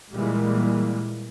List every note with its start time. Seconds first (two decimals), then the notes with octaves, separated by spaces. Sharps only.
0.13 A#2 E3 G3 G#3 A#3